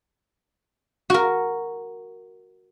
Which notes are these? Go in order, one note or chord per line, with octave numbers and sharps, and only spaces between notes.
F#4 A#4